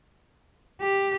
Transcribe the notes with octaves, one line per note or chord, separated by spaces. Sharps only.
G4